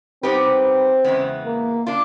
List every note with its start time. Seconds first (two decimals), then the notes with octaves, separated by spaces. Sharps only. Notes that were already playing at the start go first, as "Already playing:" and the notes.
0.23 G3 B3 C4 D#4 G4 B4
1.04 E2 C#3 E3 G#3 B3
1.46 A#3
1.87 D4 F4